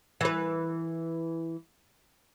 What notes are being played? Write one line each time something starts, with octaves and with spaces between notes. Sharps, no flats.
E3 B4